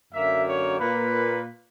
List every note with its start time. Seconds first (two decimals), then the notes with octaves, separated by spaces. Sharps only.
0.12 F#2 D3 F#3 A#3 E5
0.47 C#5
0.79 A#2 A#3 B4